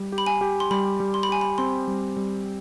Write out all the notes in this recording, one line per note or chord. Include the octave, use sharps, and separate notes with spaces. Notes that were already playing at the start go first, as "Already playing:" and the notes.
Already playing: G3
G4
B5
G#5
G4
C6
G3 B5
G3
C6
B5
G4 G#5
B5
C4 C6
G3
G3